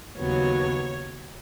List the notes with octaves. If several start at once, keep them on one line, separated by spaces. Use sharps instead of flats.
D#2 C#3 F#3 B3 C#5